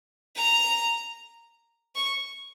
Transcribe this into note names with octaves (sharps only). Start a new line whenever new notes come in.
A#5
C#6